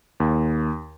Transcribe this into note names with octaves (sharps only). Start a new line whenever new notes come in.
D#2